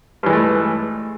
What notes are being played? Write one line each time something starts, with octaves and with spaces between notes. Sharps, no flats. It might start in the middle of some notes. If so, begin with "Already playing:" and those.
G2 E3 G#3 A3